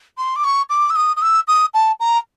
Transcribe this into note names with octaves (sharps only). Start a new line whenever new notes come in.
C6
D6
C#6
D6
E6
D#6
D#6
E6
D#6
A5
A#5